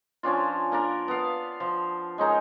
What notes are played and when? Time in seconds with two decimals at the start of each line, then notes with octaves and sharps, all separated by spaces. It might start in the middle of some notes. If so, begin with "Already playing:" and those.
0.23 F3 C#4 D4 F4
0.72 A#3 D4 A#4
1.08 B3 F5
1.60 F3
2.18 G#3 C#4 D#4 A#4